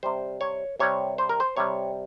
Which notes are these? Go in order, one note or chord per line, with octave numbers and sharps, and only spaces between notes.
C3 G3 C5
C#5
C3 G3 C#5
C5
A#4
C5
C3 G3 C#5